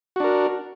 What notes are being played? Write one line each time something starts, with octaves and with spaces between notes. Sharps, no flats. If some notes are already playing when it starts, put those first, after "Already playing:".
D4 F#4 A#4